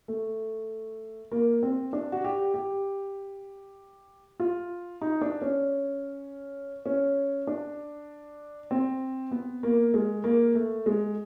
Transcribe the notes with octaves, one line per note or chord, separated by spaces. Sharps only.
A3
A#3
C4
D4
F#4
G4
G4
F4
D#4
D4
C#4
C#4
D4
C4
B3
A#3
G#3
A#3
A3
G#3